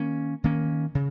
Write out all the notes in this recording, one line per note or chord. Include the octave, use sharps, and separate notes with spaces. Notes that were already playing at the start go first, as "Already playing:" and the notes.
Already playing: D#3 A#3 C#4
D#3 A#3 C#4
C#3